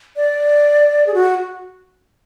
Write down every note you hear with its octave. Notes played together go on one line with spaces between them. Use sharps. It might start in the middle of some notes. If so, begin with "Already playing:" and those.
D5
G#4
F#4